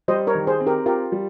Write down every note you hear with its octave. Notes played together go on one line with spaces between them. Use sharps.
G3 C5 D#5
A#4 C#5
D#3
G#4 C5
C4
G4 A#4
F4 G4 A#4
G3